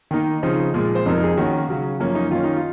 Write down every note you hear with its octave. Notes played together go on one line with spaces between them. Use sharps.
D#3 A#3 D#4
C#3 F3 C4 D#4
A#2 F3 G#3
C5
F2 C3 F3 C4 D#4 A#4
G#4
D#3 A#3 C#4 F#4
C#3 F#3 C#4
F#2 F3 A#3 C#4
D#4
D#3 A#3 C#4 F4
D#4
F4